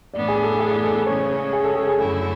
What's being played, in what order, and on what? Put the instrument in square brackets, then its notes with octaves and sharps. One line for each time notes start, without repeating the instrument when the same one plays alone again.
[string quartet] A2 E3 B3 D4 [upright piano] D5
[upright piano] G#4
A4
G#4
A4
[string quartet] C#3 G#3 C#4 [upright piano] C#5
[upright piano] G#4
A4
G#4
G#4
[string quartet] F#2 D3 A3 E4 [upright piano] A4